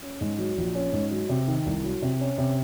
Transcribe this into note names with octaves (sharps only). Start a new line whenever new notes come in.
C#4
G#2
F#3
A#1
C#4
G#2
F#3
C3
D#3
C2
F#3
C3
C#4
C3